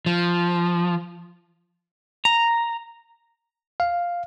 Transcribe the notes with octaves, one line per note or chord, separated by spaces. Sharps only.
F3
A#5
F5